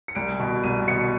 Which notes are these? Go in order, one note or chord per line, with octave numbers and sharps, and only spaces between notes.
C#7
C2 D7
B2
C2 D#7
B2 C#7